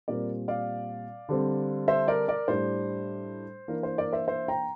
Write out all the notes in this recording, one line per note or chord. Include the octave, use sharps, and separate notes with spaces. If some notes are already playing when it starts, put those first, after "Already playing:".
A#2 G3 C4 A#4 D5
D5 F5
D3 G3 C4
C5 E5
A#4 D5
A#4 D5
A2 G3 D4 C5
E3 A#3 D4 A#4
C5
A#4 D5
C5 E5
C5 E5
G5 A#5